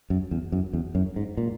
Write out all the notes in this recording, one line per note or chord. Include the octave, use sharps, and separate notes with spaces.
F#2
E2
F#2
E2
F#2
G#2
A#2